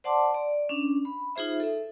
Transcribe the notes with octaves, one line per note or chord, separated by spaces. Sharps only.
C5 D5 F#5 A5 C6 D6
D5
C#4 D4
B5
D#4 F4 G#4 C5 E5
A4 E5